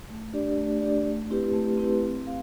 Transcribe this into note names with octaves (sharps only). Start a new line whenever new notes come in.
A3
D4 G4 D5
A3
D4 G4 D5
A3
C4 E4 G4 B4
A3
C4 E4 G4 B4
C4
F5